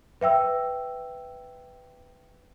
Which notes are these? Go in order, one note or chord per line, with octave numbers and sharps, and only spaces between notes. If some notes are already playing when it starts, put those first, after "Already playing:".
B4 E5 G5 E6